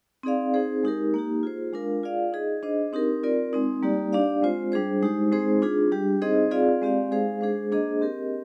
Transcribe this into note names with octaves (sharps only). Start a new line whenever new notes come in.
C4 D#4 G#4 D5 F5
C4 D#4 G#4 C5
G#3 D#4 G4 A#4
A#3 D#4 G4
F4 G#4 C5
G#3 D4 F4 A#4 F5
F4 G#4 D5 F5
D#4 G#4 D#5
D4 G#4 C5 D#5
C4 D#4 G4 A#4
C4 F4 A#4 D5
G#3 C4 D#4
G3 A#3 D#4 G4 D5
D4 G4 D5 F5
G#3 C4 F4 C5
G3 D4 G#4 C5
G#3 D#4 G4 C5
G#3 C4 D#4 G#4 C5
D4 F4 G#4
G3 D4 G4
C4 D#4 G#4 C5 D#5
C4 F4 G#4 D5 F5
G#3 C4 G4 D5 F5
G#3 D#4 G#4 C5 F5
G#3 D4 G#4 C5
A#3 D4 G#4 C5 D#5
C4 G4 A#4 D#5